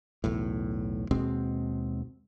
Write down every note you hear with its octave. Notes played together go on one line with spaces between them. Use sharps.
B1 E2 A2
D#2 B2 G#3 C4